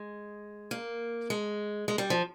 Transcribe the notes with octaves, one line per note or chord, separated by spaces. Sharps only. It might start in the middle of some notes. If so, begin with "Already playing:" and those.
Already playing: G#3
A#3
G#3
G#3
G3
F3